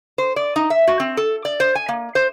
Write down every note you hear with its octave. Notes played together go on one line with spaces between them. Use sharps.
C5
D5
D#4
E5
F#4
C4
A4
D5
C5
G#5
A#3
C5